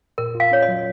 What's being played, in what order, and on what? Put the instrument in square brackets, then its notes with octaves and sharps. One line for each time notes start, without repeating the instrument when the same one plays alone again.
[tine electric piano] A#2 [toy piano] A#4
[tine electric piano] F4
[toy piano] F5
[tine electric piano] C#4 [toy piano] C#5
[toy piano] D#5
[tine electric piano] F#3